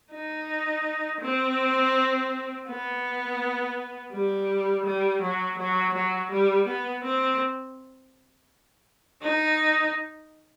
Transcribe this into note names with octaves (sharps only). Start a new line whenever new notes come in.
D#4
C4
B3
G3
G3
F#3
F#3
F#3
G3
B3
C4
D#4